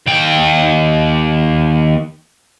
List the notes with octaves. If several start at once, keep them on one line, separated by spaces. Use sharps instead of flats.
D#2 G5